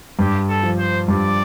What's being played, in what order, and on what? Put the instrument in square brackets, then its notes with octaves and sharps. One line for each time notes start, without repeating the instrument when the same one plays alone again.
[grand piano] G2 [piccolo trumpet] G4
[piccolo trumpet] A4
[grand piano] F3
[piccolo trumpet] C5
[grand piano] G2 [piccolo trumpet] D5